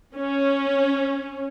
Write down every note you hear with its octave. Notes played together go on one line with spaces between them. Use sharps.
C#4